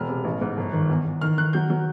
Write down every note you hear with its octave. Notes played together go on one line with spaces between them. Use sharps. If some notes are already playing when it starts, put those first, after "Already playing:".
Already playing: E1 F6
C3
A1
G#2
G1
D#3
E2
E2
D#3 F6
D#3 F#6
F#3 G6
F#3